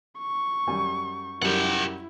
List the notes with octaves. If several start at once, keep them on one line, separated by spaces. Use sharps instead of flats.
C#6
F#2 G3 G#5
F#2 G3 E4 G4 A#4 F#5